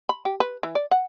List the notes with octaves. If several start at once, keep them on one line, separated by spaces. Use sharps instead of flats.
B5
G4
B4
E3
D5
F#5